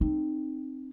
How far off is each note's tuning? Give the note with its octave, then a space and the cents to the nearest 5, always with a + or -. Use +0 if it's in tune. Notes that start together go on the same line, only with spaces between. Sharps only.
C4 +5 D#4 -20